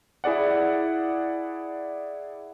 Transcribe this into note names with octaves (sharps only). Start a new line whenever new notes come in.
E4 G#4 D5 F#5